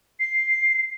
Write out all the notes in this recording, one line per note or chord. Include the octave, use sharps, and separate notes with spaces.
C7